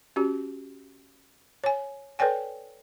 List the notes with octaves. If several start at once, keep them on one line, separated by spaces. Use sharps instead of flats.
C#4 F#4 G4
C#5 G#5
A4 B4 C#5 D5 G5 G#5